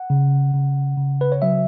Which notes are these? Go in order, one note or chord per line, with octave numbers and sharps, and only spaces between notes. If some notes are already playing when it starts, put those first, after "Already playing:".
Already playing: F#5
C#3
C#3
C#3
B4
C#5
F#3 E5